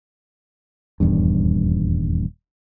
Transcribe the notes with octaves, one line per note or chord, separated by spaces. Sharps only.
D#1 E2 G2